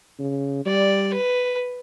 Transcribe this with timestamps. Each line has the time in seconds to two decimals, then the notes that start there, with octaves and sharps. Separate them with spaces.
0.19 C#3
0.66 G3 D5
1.14 B4